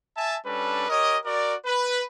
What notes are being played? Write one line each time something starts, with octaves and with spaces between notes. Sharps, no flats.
E5 G#5 A5
G3 C#4 D4 A4 B4
G4 A#4 C#5 D#5
F#4 A#4 D5
B4